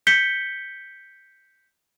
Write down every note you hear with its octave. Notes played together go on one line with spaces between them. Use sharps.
G6 B6 C#7 G7